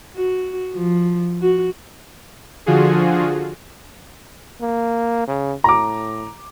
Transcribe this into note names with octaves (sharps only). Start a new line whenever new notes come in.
F#4
F3
F#4
D3 F3 F4 F#4 G#4
A#3
C#3
A2 A#5 D6